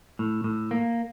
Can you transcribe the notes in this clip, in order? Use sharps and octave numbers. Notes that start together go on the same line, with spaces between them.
A2
A2
A#3